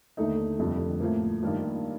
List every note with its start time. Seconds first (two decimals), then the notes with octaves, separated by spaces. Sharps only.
0.17 D#2 D3 A3 D#4
0.59 F1 F2 D3 G3
1.00 A2 F3 A#3
1.42 G2 D#3 A#3 D4 F4